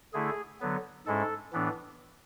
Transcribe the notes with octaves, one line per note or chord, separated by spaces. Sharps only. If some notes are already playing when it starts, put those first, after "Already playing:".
D3 A3 E4 G#4
D3 F#3 B3
G#2 G#3 C#4 E4 A4
A2 E3 B3 D4